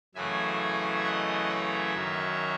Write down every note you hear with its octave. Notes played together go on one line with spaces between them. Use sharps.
F#2 C#3 E3 A3 E5 G#5
D#5 F#5
C#5 E5
F#2 D#3 F#3